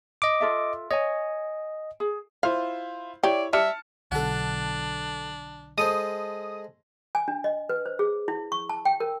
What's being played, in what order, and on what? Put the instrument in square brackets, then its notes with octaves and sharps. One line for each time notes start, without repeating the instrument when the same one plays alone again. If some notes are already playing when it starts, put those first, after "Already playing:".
[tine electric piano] D#5 D6
[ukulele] F4 A4 E5
[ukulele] C#5 G#5 [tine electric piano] D#5
[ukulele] G#4
[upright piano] E4 F4 C5 [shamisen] F5
[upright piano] E4 C#5 [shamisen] G4 [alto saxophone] D5
[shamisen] G3 [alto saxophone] E5 [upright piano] A5 F6 C#7
[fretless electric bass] B1 B2 D3 [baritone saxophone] D4 [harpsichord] A4 F#5
[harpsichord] G#3 A4 C5 [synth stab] D#6
[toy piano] G#5
D4
D#5
B4
C5
G#4
E4
C#6
A5
G5
A#4